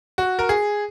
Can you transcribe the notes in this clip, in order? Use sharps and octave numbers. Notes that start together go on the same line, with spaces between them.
F#4
A#4
G#4